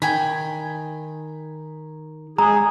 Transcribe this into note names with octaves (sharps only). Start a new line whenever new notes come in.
D#3 G5 G#5 B5
G#3 G#4 A#5